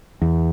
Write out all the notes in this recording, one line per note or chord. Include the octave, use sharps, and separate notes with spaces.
E2